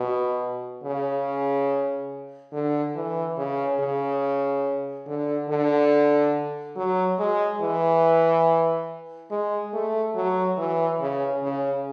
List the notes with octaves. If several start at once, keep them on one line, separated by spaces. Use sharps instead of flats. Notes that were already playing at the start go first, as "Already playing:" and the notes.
Already playing: B2
C#3
D3
E3
C#3
C#3
D3
D3
F#3
G#3
E3
G#3
A3
F#3
E3
C#3
C#3